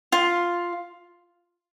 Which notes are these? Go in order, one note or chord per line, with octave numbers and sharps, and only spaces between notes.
F4